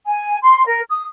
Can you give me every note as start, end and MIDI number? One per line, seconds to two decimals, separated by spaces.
0.08 0.36 80
0.42 0.65 84
0.65 0.80 70
0.89 1.02 87